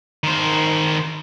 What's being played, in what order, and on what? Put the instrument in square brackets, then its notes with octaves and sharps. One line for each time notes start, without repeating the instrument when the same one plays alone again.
[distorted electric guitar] D#3 C5